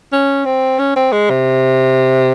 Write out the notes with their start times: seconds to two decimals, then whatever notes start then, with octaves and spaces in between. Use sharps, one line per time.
0.12 C#4
0.45 C4
0.79 C#4
0.96 C4
1.12 G#3
1.30 C3